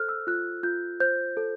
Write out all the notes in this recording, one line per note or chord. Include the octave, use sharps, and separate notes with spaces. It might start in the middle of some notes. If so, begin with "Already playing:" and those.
Already playing: A4 C5 F6 F#6
E6
F4 F#6
F4 G6
C5 G6
A4